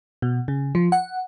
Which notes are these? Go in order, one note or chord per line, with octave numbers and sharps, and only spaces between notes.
B2
C#3
F3
F#5